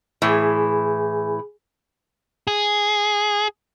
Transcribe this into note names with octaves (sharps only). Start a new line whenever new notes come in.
A2 E3 G#4 G#5
G#4